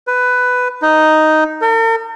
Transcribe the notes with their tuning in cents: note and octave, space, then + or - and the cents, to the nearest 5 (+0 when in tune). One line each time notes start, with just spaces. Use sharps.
B4 +10
D#4 +0
A#4 -45